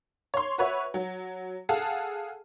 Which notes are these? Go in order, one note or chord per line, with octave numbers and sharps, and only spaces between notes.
C#5 C6
F#4 B4 C#5 E5
F#3
G#4 A4 F5 F#5 A5